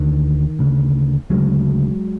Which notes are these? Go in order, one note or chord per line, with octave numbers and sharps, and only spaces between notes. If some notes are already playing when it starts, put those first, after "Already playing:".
Already playing: D2 D3 D#3
D2 C#3
D2 C#3 F#3 G#3